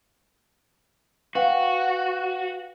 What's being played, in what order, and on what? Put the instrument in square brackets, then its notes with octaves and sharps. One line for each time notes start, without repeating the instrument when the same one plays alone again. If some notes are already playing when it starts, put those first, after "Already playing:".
[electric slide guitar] F#4 [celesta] B4 F5 G5